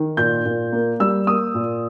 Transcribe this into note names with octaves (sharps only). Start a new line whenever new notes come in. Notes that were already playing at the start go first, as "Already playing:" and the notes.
Already playing: D#3
A#2 G6
A#2
A#3
G3 E6
A#3 D#6
A#2